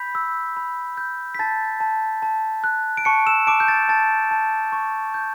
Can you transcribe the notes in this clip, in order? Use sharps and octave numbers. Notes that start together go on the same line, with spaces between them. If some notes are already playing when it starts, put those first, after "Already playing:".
Already playing: B5 G6 B6
E6
B5
G6
B6
A5 A6
A5
A5
F#6
D7
A5 C#6 C#7
E6 E7
A5 D6 D7
G6
A6
A5 A6
A5
C#6
G6